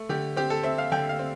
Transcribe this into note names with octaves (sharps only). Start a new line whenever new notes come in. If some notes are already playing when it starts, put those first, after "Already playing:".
Already playing: A3
D3 G4
C4 G4
A4
C4 E5
F5
D3 G5
F5
C4